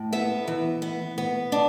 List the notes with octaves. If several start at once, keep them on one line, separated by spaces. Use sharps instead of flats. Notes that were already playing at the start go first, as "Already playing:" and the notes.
Already playing: A2
B3 E5
E3
B3
B3
D4